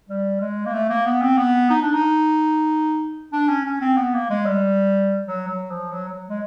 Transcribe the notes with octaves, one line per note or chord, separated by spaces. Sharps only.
G3
G#3
A#3
A3
A#3
B3
C4
B3
D#4
D4
D#4
D4
C#4
C#4
C4
B3
A#3
G#3
G3
F#3
F#3
F3
F#3
F#3
G#3